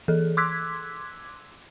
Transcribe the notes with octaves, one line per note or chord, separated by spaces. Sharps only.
E3 G#4 A4
C6 D6 E6 F#6 G#6 B6